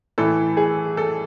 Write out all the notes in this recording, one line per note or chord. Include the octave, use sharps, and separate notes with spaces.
A2 E3 A4
G#4
A4